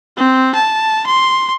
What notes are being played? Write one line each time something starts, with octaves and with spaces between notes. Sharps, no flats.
C4
A5
C6